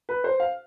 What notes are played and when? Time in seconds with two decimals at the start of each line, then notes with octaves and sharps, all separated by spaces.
0.09 B4
0.24 C5
0.40 F5